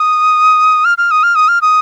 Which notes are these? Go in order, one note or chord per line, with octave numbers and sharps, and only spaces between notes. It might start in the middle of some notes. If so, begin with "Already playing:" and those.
Already playing: D#6
F6
F6
D#6
F6
D#6
F6
D#6